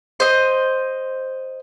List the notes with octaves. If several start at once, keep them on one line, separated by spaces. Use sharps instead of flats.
C5 D#5